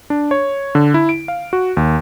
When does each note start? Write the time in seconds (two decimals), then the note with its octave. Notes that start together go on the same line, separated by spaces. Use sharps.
0.10 D4
0.31 C#5
0.75 D3
0.94 E4
1.09 D7
1.28 F5
1.53 F#4
1.77 D#2